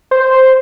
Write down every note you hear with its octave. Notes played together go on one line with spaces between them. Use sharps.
C5